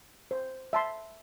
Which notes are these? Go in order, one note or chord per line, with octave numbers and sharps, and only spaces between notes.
C5
E5 A5 C6